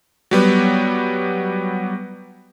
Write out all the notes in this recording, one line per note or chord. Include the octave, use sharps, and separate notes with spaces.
F#3 G3 B3